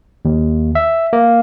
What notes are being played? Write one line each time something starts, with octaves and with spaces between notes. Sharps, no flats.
D#2
E5
A#3